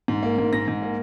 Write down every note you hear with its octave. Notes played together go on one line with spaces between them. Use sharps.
G#2
A#3
G#2
G#2 A#6
G#2
A#3